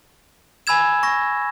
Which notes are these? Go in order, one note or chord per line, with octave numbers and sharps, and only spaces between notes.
G#5 B5 E6 G#6 E7
C#6 A#6